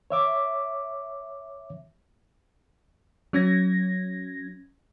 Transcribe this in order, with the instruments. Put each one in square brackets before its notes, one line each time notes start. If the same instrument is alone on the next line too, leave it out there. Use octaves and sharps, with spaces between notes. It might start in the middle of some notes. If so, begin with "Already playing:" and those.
[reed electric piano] C#5 E5 D6
[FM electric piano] F#3 C#4 G#6 A#6